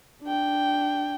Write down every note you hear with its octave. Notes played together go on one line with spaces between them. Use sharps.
D4 G5